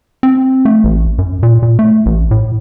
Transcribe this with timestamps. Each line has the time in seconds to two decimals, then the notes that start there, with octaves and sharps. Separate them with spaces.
0.23 C4
0.65 A3
0.84 A1
1.18 F#2
1.43 A#2
1.63 A#2
1.79 A3
2.06 A1
2.31 A2